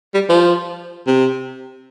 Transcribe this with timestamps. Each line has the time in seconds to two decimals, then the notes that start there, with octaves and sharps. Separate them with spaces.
0.14 G3
0.29 F3
1.07 C3